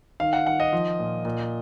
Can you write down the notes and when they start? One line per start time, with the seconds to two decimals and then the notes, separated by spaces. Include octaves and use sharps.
0.20 D#3 F5
0.33 F#5
0.46 D#3 F#5
0.60 D#5
0.73 F3
0.99 A#2
1.25 A#2